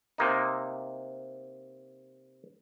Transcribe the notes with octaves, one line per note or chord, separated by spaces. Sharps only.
C3 A#3 D#4